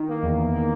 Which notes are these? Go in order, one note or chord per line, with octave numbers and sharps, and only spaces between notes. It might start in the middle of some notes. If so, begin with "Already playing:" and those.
Already playing: D#3
A#3
E2
E2
A#3